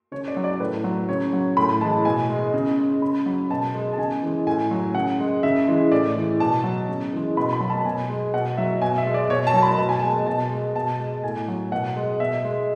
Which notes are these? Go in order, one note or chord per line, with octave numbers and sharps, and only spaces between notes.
C#3 C#5
D5
F#3
D5
A2 B4
F#3
C#3 C#5
F#3
A2 B5
E3 G#3 A5
B2 G#5
G#3
C#3
G#3
C#3 B5
F#3
B2 A5
G#3
A5
C#3 G#5
E3 G#3
A2 G#5
F#3
C#3 F#5
G#3
C#3 E5
E3 G#3
A2 D5
E3 G#3
B2 A5
F#3
C#3
E3 G#3
B2 B5
B5
F#3
A5
B2 G#5
G#3
B2 F#5
F#3 E5
B2 G#5
E5
G#3
D5
B2 C#5
A5
F#3
B5
B2 A5
G#5
A5
G#3
B2 A5
G#3
B2 A5
G#3
A2 G#5
F#3
B2 F#5
G#3
B2 E5
G#3